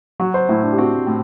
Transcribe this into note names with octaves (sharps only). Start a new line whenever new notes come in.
F#3 F#4
C5
A2 E4
D4
G4
C4 F#4
A2